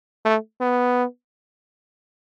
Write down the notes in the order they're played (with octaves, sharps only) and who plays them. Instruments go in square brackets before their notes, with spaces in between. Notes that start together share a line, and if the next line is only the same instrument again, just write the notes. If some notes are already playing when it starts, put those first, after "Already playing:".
[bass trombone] A3
B3